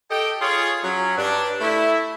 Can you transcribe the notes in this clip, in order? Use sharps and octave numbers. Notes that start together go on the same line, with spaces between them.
G4 A4 D#5 G5
F4 G#4 C#5
F#3 C#4
G2 D4
A3 E4